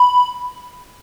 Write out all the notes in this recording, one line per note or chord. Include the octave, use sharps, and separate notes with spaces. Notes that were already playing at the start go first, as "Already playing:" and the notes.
Already playing: B5